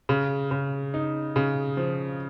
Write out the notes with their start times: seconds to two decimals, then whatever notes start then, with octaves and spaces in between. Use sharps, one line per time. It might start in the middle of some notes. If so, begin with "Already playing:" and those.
0.09 C#3
0.51 C#3
0.94 D#4
1.36 C#3
1.77 F3